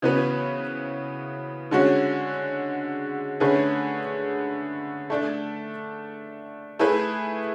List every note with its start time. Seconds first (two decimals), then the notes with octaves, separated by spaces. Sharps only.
0.02 C#3 E3 B3 F#4 B4
1.71 D3 G#3 C#4 F#4
3.40 D3 A3 C#4 G#4 B4
5.10 A3 D4 A4
6.79 A3 E4 G#4 B4